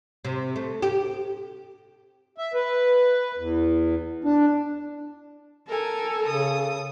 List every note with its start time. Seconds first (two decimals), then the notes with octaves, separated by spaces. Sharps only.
0.25 C3
0.56 A3
0.82 G4
2.38 E5
2.54 B4
3.38 E2
4.24 D4
5.68 A4 A#4 G#5
6.27 C#3 D#6